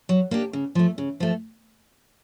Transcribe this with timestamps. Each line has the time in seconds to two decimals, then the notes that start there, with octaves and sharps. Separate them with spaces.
0.09 F#3
0.31 A#3 D4 G4
0.53 C#3
0.75 F3 A3
0.98 C#3
1.20 F3 A3